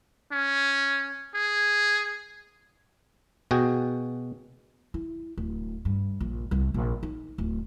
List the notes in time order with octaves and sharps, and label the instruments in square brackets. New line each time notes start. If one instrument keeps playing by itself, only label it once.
[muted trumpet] C#4
G#4
[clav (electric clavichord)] B2 F#4 G#4 G5
[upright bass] E4
D1
G2
A#1
C2
A#1
D#4
D1